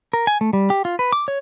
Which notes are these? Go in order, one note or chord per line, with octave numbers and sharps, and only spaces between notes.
A#4
G#5
A3
G3
G4
F4
B4
D6
C#5